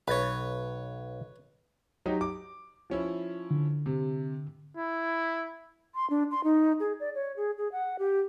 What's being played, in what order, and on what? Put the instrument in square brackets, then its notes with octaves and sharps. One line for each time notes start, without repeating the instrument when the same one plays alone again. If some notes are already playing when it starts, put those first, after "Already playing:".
[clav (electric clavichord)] B1 [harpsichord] B4 C#5
[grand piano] F#3 D#4 G4
D6
F3 C#4 E4
[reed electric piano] D3
[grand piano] C3
[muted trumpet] E4
[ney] C6
D4
C6
D#4
G#4
D5
C#5
G#4
G#4
F#5
G4